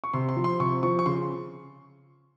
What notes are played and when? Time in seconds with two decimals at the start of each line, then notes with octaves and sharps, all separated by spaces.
0.04 C#6
0.14 C3 C6
0.29 C6
0.37 F3
0.44 C6
0.60 C3 C#6
0.83 F3 C#6
0.99 C#6
1.06 C#3 C6